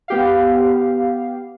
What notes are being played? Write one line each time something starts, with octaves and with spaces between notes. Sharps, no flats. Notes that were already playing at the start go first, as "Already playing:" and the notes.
B3 G4 F5